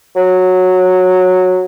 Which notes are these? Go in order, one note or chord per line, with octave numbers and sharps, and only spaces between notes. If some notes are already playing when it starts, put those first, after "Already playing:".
F#3